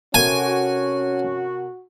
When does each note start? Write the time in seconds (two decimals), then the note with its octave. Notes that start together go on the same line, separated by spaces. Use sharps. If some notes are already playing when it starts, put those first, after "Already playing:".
0.14 C3 C#4 F#4 A4 A#4 G#5